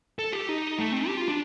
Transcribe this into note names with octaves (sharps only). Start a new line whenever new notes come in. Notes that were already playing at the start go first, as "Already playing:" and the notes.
A4
G4
D#4
A3
C4
G4
F4
D4